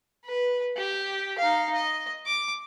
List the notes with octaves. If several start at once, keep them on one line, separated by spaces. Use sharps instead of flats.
B4
G4
D#4 F5
D#5
D6